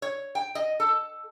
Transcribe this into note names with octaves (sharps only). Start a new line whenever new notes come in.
C#5
G5
D#5
A4